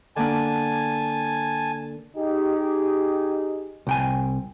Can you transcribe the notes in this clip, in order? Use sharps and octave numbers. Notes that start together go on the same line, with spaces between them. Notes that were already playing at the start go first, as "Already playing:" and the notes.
D3 A#3 D4 G#5 A5
D#4 G4 G#4
C2 G5 G#5